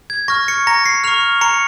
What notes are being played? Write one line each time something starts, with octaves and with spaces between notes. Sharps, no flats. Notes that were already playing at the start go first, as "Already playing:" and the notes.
G#6
C#6 F6 A#6
C#7
A#5 A#6
C7
C#6 F6 F7
A#5 C#7